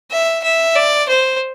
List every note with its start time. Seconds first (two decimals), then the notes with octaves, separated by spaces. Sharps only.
0.12 E5
0.44 E5
0.76 D5
1.09 C5